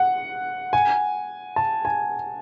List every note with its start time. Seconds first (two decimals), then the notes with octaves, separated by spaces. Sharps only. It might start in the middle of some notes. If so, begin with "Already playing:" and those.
Already playing: F#5
0.73 G#5
1.56 A5
1.85 G#5